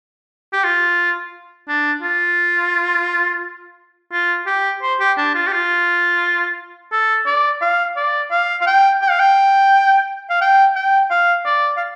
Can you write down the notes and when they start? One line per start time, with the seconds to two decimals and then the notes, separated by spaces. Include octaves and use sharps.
0.53 G4
0.64 F4
1.68 D4
2.02 F4
4.12 F4
4.47 G4
4.82 C5
5.00 G4
5.18 D4
5.35 F4
5.47 G4
5.52 F4
6.92 A4
7.26 D5
7.62 F5
7.96 D5
8.31 F5
8.61 F5
8.66 G5
9.02 G5
9.10 F5
9.19 G5
10.30 F5
10.41 G5
10.76 G5
11.10 F5
11.45 D5
11.77 F5